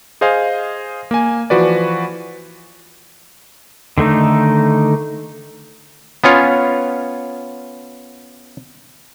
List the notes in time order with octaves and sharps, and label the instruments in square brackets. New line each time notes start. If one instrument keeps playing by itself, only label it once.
[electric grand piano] G#4 C5 D#5 F5 G#5
A#3 G#5
E3 F3 F#4 B4 D5
[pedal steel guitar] D3 D#3 A3 D#4
[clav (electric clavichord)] B3 C#4 F4 C#5